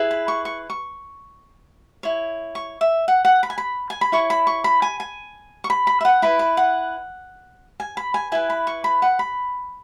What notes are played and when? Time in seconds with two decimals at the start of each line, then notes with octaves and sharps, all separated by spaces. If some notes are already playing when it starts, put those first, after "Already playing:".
Already playing: E4 G#4 B4
0.11 B5
0.28 C#6
0.45 C#6
0.70 C#6
2.03 E4 C#5
2.55 C#6
2.81 E5
3.08 F#5
3.25 F#5
3.43 B5
3.50 G#5
3.58 B5
3.90 G#5
4.01 B5
4.12 E4 C#5 C#6
4.30 B5
4.47 C#6
4.64 B5
4.82 G#5
5.00 G#5
5.64 C#6
5.70 B5
5.87 B5
6.01 E5
6.05 F#5
6.22 E4 B4 B5
6.39 B5
6.57 F#5
7.80 G#5
7.97 B5
8.14 G#5
8.32 E4 B4 G#5
8.50 B5
8.67 C#6
8.84 B5
9.02 F#5
9.19 B5